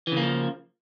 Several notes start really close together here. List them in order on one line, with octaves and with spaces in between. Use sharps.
E3 C#3 A#3 F3